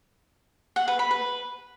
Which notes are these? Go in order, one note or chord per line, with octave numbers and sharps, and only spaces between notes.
F#5
B4
B5
B4